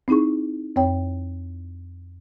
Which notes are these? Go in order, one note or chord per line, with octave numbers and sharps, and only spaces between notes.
C4 D#4 E4 G#4 C#6
F2 C4 C#5 G5